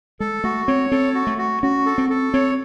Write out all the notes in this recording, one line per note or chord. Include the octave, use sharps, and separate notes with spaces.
G#3 A4
A3 F#4
C4 C#5
C4 A4
F#4
A3
F#4
C#4 F#4
A4
C4
A4
C4 C#5